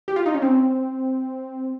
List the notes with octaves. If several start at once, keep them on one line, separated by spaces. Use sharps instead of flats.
G4
F4
D#4
C#4
C4